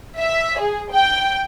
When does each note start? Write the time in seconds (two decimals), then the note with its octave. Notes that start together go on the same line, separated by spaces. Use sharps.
0.17 E5
0.59 G#4
0.92 G5